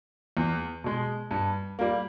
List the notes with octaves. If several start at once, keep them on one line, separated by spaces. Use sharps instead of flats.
E2
B2 G#3
G2
G3 A#3